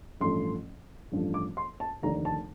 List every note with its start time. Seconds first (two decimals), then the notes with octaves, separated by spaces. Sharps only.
0.21 A1 G2 F3 A3 C6
1.12 A1 G2 F3 A3
1.34 D6
1.57 C6
1.80 A5
2.02 F1 D#2 D3 A3 D4 A#5
2.25 A5